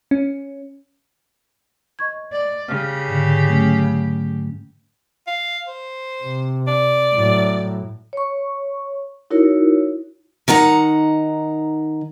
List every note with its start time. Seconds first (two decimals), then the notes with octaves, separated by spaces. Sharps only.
0.11 C#4
1.99 D#5 C#6 G#6
2.32 D5
2.69 C#3 G4 F6
3.08 G#2 D3
3.47 F#3 A3 C#4
5.27 F5
5.67 C5
6.24 C3
6.68 D5
7.14 A2 F#3
8.13 C#5 C#6
9.31 D#4 E4 F#4 A#4 C#5
10.48 D#3 D#4 F#5 A#5